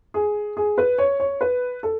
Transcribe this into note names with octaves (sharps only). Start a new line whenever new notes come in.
G#4
G#4
B4
C#5
C#5
B4
A4